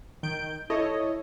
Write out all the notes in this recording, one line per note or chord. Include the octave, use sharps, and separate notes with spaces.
D#3 G6 D7
E4 A4 C#5 D#5